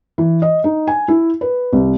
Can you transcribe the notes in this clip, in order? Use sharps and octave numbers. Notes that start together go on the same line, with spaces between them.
E3
D#5
D#4
G#5
E4
B4
C2